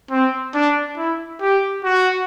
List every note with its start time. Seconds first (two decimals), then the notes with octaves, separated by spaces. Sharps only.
0.11 C4
0.55 D4
0.97 E4
1.41 G4
1.84 F#4